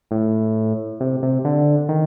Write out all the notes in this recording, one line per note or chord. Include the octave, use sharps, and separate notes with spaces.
A2
C3
C3
D3
D#3